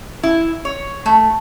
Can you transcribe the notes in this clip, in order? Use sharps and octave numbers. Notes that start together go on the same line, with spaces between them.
E4
C#5
A3